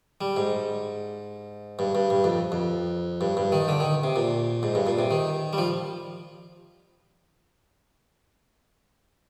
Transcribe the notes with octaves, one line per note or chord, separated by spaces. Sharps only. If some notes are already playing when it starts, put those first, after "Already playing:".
G3
G#2
G2
G2
G2
F2
F2
G2
G2
D#3
D3
D#3
C3
A#2
G#2
G2
A#2
C3
D#3
G3
F3